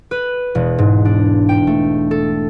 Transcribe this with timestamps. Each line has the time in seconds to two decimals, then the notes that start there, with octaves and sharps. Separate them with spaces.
0.11 B4
0.55 E1
0.79 G#2
1.05 D4
1.49 G5
1.67 A3
2.11 A4